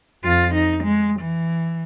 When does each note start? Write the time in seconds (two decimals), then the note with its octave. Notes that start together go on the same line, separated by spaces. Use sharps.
0.24 F2 F4
0.54 D#4
0.84 G#3
1.20 E3